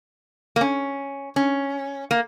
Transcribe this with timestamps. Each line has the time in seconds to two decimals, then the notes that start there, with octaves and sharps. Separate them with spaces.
0.56 A#3
0.61 C#4
1.36 C#4
2.11 A#3